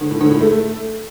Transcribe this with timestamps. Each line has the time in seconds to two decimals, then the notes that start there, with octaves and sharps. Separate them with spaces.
0.01 D3
0.11 A2
0.21 D3
0.31 A2
0.41 A3